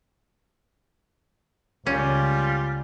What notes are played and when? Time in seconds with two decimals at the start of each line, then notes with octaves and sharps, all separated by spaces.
1.87 C#2 G3 A#3 C#4 F4